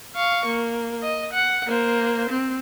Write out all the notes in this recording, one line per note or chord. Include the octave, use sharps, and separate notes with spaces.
F5 C#6
A#3
D#5
F#5
A#3 C5
C4